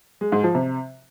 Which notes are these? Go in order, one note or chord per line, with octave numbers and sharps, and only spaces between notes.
G#3
G#2
F3
C3